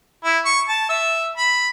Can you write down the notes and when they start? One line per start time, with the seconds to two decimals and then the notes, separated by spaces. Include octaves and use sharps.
0.25 E4
0.46 C#6
0.69 A5
0.89 E5
1.38 B5